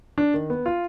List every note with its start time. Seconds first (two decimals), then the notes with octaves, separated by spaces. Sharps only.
0.18 D4
0.34 D#3
0.50 B3
0.66 F4